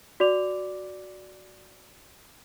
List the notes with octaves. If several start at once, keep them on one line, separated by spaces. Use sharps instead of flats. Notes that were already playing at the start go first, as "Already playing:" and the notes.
F#4 D5 D6 F7